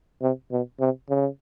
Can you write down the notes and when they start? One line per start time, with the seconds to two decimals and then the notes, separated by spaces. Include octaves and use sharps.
0.22 C3
0.51 B2
0.80 C3
1.09 C#3